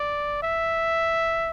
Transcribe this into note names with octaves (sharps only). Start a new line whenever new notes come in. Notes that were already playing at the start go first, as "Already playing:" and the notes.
Already playing: D5
E5